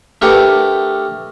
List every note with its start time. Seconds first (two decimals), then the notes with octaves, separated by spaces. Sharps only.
0.22 A3 D4 G4 A#4 B4 F#5